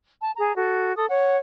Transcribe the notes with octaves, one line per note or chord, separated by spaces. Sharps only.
A5
G#4 A#5
F#4 A4
A4 D#6
C#5 F#5